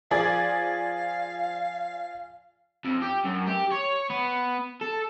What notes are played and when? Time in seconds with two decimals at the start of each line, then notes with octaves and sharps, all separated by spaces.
0.11 F3 G#4 D5 F5
2.85 F2
3.02 G4
3.24 F#2
3.47 G4
3.72 C#5
4.10 B3
4.81 A4